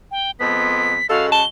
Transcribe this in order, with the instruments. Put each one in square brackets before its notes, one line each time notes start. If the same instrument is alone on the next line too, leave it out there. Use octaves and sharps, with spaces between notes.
[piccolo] G5
[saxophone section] F2 G#3 B3 [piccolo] B6
[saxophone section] C#3 G#3 F#4 [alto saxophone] A4 [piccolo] F5
[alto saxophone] A5 [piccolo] G7